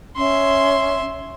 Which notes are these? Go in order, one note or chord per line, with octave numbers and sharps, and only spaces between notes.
C#4 E5 C6